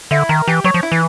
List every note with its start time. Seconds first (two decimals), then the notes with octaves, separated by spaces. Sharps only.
0.11 D3 E4
0.29 D#3 A#4
0.47 E3 G4
0.64 F#3 C#5
0.74 F3
0.83 E4
0.92 E3